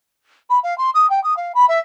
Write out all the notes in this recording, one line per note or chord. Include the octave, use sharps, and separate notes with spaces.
B5
F5
C6
D#6
G5
D#6
F5
B5
E5